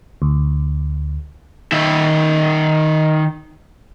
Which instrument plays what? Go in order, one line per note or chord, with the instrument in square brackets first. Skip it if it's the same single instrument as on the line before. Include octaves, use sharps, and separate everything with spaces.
[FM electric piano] D2
[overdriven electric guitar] D#3 E5